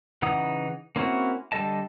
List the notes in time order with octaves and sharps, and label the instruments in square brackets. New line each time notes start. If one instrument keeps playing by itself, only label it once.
[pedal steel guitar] C#3 E3 D#4 F#5 D#6
A#3 C4 C#4 E4 F#4
D3 G3 A4 D#5 A5